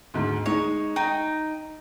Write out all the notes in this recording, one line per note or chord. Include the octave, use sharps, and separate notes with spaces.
D2 G#2
G#3 D#4 C#5
D#4 G5